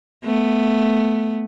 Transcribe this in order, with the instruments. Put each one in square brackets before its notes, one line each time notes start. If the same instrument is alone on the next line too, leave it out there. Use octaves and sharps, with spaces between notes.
[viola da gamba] A3 B3